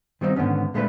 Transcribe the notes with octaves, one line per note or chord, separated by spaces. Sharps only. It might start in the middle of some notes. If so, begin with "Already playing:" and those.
D#3 G3 C4 D4 D#4
G#2 D3 D#3 B3 C#4
A#2 G#3 A3 D4 A4 B4